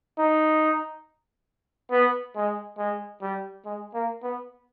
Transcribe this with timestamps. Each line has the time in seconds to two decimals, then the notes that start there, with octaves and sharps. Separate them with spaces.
0.19 D#4
1.92 B3
2.36 G#3
2.78 G#3
3.22 G3
3.65 G#3
3.94 A#3
4.23 B3